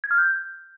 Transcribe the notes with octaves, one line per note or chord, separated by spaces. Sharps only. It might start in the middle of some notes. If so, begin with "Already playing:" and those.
G#6
F6
G6